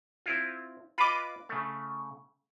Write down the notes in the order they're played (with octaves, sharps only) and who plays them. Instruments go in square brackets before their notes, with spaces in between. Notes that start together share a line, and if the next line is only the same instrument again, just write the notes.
[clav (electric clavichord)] C4 E4 F4
[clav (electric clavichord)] F4 B4 D#5 [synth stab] B5 D6
[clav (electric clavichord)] C#3 A3